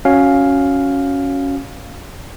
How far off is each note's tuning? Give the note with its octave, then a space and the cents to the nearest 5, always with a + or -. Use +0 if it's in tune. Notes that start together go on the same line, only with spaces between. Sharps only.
C#4 +0 F#4 +0 F5 +5